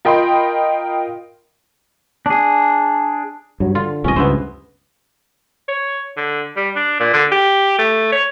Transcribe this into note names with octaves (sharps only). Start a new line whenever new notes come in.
F4 A#4 D#5 G5 B5 C6
D4 G#4
G2 F#3
D3 F4
D1 C2 F2 C#4 D#5
C#2 G2 B3 E4 C5
C#5
D3
G3
D4
A#2
D3
G4
A3
C#5